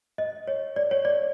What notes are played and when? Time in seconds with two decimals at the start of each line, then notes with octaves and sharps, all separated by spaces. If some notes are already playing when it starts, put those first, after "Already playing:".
0.18 D#5
0.48 C#5
0.76 D5
0.91 C#5
1.05 D5